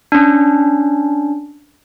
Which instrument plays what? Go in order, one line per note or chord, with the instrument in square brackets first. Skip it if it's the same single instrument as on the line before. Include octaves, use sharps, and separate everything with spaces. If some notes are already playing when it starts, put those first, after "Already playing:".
[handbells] C#4 D4